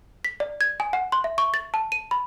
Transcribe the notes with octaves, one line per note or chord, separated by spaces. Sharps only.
B6
D5
G#6
G#5
F#5
C6
E5
C#6
A6
A5
D#7
B5